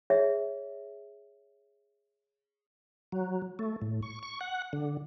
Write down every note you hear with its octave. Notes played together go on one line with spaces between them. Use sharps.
G#4 C#5 E5
F#3
A3
A2
C#6
C#6
F#5
D3